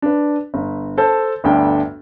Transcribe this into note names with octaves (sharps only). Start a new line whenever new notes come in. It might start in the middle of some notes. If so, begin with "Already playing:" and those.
D4 B4
G1
A4 C5 A5 G6
G1 D2 D4 G5